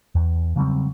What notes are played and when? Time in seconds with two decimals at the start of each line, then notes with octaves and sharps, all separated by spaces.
0.15 E2
0.56 C#3 F#3 G3 C4